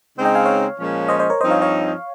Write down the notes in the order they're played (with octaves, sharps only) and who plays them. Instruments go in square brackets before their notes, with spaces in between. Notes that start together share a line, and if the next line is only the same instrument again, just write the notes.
[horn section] C#3 G#3 C4 D#4
[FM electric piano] D#5 G5
F5 G#5
C#5 F5
[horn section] A#2 F3 G#3 C#4
[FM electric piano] C5 D#5
C5 D#5
A#4 C#5
[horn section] G2 F3 C4 D#4 [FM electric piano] C5 D#5
[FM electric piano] C#5 F5
C#5 F5